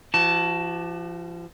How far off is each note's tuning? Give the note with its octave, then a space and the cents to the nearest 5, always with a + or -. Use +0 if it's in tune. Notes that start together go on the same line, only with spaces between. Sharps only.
F3 -35 F#4 +25 A5 +0